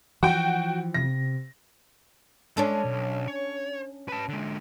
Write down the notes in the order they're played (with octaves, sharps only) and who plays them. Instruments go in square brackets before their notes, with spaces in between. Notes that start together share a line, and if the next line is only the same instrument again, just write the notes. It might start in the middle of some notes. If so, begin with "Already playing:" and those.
[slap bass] E3 F3 [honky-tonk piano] F#4 G5
[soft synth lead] C3 [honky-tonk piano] A#6
[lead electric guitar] G#3 [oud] C#4 D4 A4
[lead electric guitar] B1
C#5
B4 A5
D3 G#3